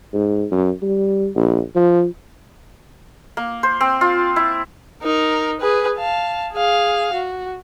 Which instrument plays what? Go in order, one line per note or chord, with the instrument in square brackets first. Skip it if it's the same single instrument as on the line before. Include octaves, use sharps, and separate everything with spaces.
[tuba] G#2
F#2
G3
A#1
F3
[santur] A#3
C5
C4
F4
E4
[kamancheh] D#4 A#4
G#4 B4
F5 A5
G#4 F5
F#4